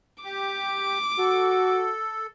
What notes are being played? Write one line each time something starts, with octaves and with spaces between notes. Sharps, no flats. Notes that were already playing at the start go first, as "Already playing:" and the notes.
G4 D6
F#4 A4